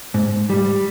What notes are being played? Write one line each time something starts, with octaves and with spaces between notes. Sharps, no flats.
G#2
G3